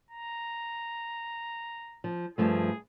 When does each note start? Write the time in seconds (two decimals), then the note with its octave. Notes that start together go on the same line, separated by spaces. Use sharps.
0.11 A#5
2.04 F3
2.38 G2 F3 A3 G#4